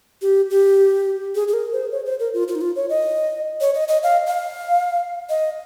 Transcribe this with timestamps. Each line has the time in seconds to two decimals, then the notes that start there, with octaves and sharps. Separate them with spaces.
0.22 G4
0.50 G4
1.35 G#4
1.48 G#4
1.53 A#4
1.72 C5
1.91 C#5
2.06 C5
2.20 A#4
2.34 F4
2.48 F4
2.55 D#4
2.61 F4
2.76 C#5
2.90 D#5
3.61 C#5
3.74 D#5
3.88 D#5
4.03 F5
4.27 F5
5.30 D#5